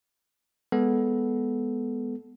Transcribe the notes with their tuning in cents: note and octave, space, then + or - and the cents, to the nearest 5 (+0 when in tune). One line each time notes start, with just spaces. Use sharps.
G#3 -15 B3 -5 A4 -15